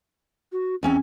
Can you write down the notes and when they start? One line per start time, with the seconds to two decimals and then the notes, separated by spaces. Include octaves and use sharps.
0.52 F#4
0.83 E2 C4 C#4 G#5